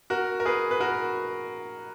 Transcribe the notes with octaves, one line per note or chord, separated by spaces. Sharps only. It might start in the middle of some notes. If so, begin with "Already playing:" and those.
F#4 A#4
A#4
G#4 B4
B4
F#4 A#4